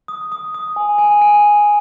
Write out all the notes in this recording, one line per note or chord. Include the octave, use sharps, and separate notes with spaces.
D#6
D#6
D#6
G#5
G#5
G#5